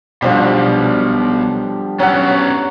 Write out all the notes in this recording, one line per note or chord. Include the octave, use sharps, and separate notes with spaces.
B1 B2 D3 F3 G3
F#3 B3 C#4 F#5